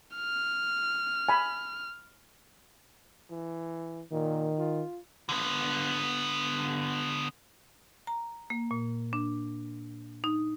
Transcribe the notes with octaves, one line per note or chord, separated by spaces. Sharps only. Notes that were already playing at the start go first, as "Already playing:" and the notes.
F6
G#5 B5
E3
A#2 D#3
F4
D3 B3
A#5
A#3
A#2
D4
D#4